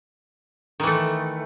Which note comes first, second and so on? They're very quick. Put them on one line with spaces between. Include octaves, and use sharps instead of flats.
D#3 E3 A3